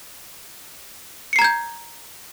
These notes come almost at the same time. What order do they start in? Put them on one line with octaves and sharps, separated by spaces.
C#7 C7 A#5 G#6 G6